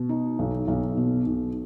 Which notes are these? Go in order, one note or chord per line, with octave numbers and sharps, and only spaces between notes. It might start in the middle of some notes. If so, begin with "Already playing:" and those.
Already playing: B2
D#4
B1
B1
B2
B1